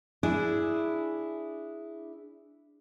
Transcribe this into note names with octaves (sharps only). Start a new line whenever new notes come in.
D4 E4 G#4